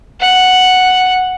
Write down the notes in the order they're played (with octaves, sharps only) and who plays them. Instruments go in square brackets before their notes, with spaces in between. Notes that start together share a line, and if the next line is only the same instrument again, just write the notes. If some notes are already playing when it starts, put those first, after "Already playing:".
[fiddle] F#5